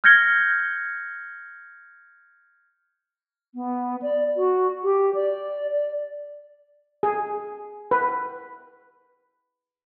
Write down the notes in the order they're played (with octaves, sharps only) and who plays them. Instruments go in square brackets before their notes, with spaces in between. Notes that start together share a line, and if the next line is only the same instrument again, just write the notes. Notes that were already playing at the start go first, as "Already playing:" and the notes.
[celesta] F6 G6 G#6 A#6 C#7 G7
[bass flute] B3
D5
F#4
G4
D5
D5
[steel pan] G#4
B4